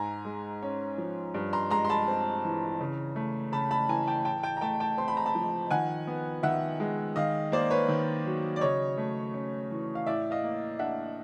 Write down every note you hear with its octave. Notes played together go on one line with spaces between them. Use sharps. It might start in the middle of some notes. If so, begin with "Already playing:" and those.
Already playing: G#2 G#5 A#5
G#3
C#4
F3
G2
A#5 C6
G#3 A#5 C6
C6
A5 B5
C4
E3
C#3
A3
C#3 A5 B5
A5 B5
E3 G#5 A#5
G5 A5
A2 G5 A5
G5 A5
A#5
A3 G5 A5
G5 A5
C4 C6
B5
A#5
A5 B5
F3
D#3 F#5 G#5
B3
D#3 E5 F#5
G#3
D#3 D#5 F5
A#3 C5 D5
B4 C#5
D#3
F#3
D5
C#3 C#5 D#5
A3
C#4
E3
F5
A2 D5 E5
D#5 F5
A#3
D4 E5 F#5